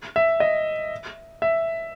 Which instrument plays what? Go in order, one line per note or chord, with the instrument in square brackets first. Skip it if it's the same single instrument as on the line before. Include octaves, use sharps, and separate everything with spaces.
[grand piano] E5
D#5
E5